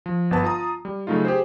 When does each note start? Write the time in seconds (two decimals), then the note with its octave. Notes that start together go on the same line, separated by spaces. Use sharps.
0.06 F3
0.31 G1 B3 B4 A5
0.43 F4 A5 A#5 D#6
0.85 G3
1.07 C#3 F#3 A3 D#4 F4
1.25 G4 G#4 C5